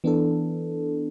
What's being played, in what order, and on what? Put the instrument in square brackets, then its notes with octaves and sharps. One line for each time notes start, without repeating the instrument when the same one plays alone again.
[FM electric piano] E3 B3 D4 A4